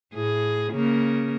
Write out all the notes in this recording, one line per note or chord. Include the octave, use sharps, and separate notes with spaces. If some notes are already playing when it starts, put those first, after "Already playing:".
A2 G#4
C#3 A#3